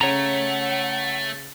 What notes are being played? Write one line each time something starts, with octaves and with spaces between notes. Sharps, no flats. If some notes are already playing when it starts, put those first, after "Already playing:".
C#3 A3 C#5 F#5 A#5